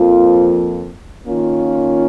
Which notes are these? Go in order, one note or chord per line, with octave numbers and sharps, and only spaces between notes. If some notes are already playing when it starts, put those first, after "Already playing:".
Already playing: F2 F3 A#3 F4
D#3 A#3 C#4 F4